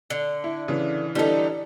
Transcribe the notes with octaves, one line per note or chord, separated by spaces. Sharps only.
D3
E4
C#3 E3
D3 E3 G3 D#4 A4